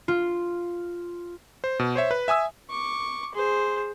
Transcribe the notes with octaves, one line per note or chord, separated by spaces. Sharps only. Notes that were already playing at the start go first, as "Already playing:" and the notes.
F4
C5
B2
C5 C#5 E5
B4
E5 G#5 D#6 E6
C#6 D6
G#4 C5